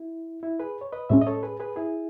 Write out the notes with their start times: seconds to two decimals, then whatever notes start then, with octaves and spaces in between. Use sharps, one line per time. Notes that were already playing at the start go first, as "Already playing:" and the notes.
Already playing: E4
0.43 E4
0.60 G#4 B4
0.81 C#5
0.92 B4 D#5
1.09 A2 G#3 C#4 C#5 E5
1.22 D#5
1.26 A4 C#5
1.43 G#4 B4
1.60 G#4 B4
1.76 E4 G#4